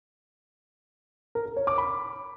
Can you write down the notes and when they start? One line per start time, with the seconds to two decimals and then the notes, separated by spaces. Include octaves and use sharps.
1.35 A#4
1.46 A#4
1.57 C#5
1.67 D6
1.78 B5